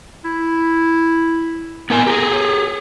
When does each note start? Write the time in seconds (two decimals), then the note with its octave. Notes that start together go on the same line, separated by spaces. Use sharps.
0.25 E4
1.90 B3 E4 A#4 G#5
2.07 G4 G#4 A#5
2.33 C#5